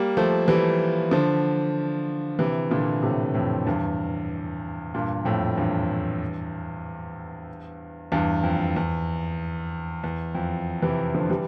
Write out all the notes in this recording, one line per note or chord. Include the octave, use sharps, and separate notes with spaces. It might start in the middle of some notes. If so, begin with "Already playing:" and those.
Already playing: G3 A#3
F3 A3
E3 G3
D3 F3
C3 E3
A#2 D3
A2 C3
F2 A2
E2 G2
G2 A#2
F2 A2
E2 G2
E2 G2
F2
E2
E2
F2
C3 E3
D3 F3
E3 G3